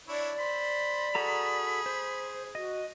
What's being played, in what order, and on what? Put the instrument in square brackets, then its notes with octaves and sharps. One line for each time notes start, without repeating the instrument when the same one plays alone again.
[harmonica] D4 E4 C#5 [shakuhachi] D5
[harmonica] C5 [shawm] B5
[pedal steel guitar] F#4 A4 A#5 [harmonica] G#4
[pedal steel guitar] C5
[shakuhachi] F#4 [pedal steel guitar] D#5